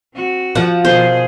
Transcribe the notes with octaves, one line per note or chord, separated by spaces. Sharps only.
C4 F#4
F3 F#5
B2 D#3 G#4 C5